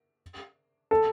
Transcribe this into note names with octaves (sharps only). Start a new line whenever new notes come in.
A4